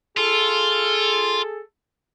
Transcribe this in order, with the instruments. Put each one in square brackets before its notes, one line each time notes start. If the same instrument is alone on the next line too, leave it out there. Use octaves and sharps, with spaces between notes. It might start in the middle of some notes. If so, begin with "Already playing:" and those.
[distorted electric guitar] F4 [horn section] G#4 A4